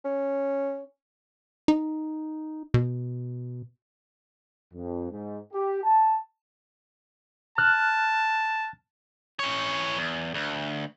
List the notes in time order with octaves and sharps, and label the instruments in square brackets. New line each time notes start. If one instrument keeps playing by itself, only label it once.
[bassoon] C#4
[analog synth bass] D#4
B2
[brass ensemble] F2
G#2
G4
A5
[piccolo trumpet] A5 [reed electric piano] F6 F#6
[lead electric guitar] E3 C#5
E2
D2